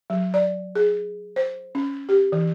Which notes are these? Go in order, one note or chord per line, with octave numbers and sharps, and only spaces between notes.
F#3
D5
G#4
C5
C#4
G4
E3